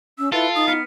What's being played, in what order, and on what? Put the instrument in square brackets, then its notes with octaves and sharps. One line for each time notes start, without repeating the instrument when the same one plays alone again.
[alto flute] C#4 [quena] E6
[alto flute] E4 [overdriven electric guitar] F4 [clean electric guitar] A4 [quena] B4
[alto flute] D#4 [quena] D#6
[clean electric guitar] B3 [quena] F6